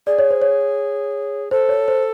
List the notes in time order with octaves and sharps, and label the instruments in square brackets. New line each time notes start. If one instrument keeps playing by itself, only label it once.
[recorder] G#4 [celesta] D5
[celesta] C#5
C5
C#5
[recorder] A4 [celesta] C5
[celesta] C#5
C5